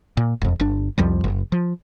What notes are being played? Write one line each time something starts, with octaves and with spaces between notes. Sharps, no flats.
A#2
E1 F2
G1 D4
C2 F2 F3 G3
F#1
F3